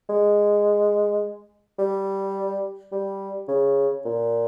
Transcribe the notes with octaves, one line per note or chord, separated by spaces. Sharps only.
G#3
G3
G3
C#3
A#2